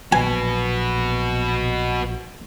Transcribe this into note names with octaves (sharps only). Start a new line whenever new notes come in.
A#1 F#3 F#4 B4 G#5